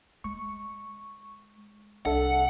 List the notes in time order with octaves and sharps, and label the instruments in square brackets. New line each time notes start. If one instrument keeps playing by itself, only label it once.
[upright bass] G#3 [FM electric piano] C#6
[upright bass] C2 [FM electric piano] D4 A4 E5 [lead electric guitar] F#5